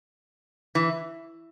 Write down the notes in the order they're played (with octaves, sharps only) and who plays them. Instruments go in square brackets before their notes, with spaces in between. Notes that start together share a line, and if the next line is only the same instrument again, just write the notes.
[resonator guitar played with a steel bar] E3